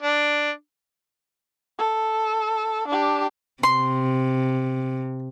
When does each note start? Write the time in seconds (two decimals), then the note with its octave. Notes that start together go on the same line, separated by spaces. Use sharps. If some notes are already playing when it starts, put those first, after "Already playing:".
0.02 D4
1.79 A4
2.88 D4 G4
3.63 C3 C6